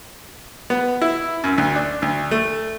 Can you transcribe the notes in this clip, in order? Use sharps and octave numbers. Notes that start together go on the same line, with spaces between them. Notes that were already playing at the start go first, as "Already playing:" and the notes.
B3
E4
F#2
D2
D4
D2
A3